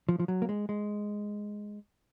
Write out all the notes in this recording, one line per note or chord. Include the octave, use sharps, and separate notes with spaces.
F3
F3
F#3
A#3
G#3
G#3